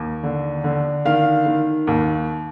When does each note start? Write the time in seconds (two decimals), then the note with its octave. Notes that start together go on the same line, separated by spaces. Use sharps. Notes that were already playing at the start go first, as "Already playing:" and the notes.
Already playing: D#2
0.23 D3
0.64 D3
1.05 D#3 F5
1.46 D#3
1.87 D#2